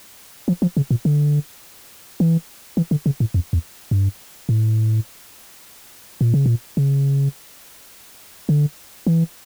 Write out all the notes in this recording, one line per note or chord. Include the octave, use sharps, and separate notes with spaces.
F3
F3
C#3
A#2
D3
E3
E3
D3
C#3
A2
F2
E2
G2
A2
A#2
C#3
A#2
C#3
D3
E3